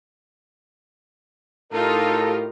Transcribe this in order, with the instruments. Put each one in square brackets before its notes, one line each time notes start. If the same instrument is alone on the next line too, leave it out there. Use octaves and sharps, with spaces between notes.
[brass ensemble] A2 A#4 [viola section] D#4 F4 G4 [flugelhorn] A4